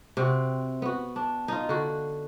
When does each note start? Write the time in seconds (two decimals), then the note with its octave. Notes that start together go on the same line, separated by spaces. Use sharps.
0.17 C3 C4 F#4
0.82 B3 F#4
1.16 D4
1.48 D#4 F4
1.69 D3 F#4